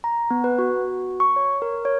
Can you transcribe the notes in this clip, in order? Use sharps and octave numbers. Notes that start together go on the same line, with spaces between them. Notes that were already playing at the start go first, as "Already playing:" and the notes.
A#5
B3
B4
F#4
C#6
C#5
A#4
C#5